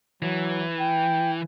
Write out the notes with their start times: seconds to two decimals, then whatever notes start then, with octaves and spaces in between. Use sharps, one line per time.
0.22 E3 F#3
0.80 G5